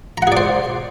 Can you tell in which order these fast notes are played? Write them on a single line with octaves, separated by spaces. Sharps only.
A#5 F#5 G#4 D5 C5